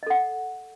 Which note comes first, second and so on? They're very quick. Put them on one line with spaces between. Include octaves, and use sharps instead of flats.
D#5 A4 F#5